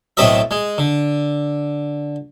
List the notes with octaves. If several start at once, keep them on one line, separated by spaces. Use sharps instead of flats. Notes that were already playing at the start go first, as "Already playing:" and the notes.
B1 A2 C4 A4 D#5 E5
G#3
D3